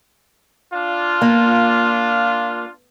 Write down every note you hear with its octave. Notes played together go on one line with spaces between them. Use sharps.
D4 F4
A#3